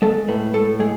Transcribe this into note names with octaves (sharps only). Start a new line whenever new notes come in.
G#3 A4
A2 B4
A2 A4
G#3 G#4